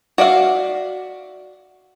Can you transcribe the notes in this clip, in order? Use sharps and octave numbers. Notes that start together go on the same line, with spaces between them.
F#4 D5 E5 F5